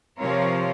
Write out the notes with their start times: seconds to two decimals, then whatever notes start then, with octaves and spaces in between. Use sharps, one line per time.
0.19 C3 F3 C4 F4 A#4 C#5